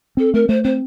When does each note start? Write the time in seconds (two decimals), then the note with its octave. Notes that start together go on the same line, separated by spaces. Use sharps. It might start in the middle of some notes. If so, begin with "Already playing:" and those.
0.17 C4 A4
0.34 A3 A#4
0.48 A3 C5
0.63 C4 C5